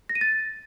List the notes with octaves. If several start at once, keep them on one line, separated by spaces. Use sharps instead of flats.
A#6
D#7
A6